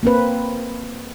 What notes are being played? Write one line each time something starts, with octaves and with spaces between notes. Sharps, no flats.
A#3 C4 B4